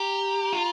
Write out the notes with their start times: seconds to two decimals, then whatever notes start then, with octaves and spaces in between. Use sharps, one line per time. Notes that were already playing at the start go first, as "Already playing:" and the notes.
Already playing: G4 A#5
0.53 F4